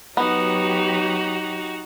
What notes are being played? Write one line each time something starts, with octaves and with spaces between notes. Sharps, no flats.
F#3 B3 D#4 F#4 G4